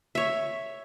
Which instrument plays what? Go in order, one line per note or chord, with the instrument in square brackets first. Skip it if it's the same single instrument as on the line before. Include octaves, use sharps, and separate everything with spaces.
[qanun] C#5 E5